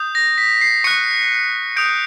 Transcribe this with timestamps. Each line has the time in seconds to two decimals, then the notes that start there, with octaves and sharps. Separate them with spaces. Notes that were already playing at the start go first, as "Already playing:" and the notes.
Already playing: D#6 G6
0.15 A#6
0.38 B6
0.61 C7
0.84 C#6 F#6 C#7
1.76 D#6 G6 D7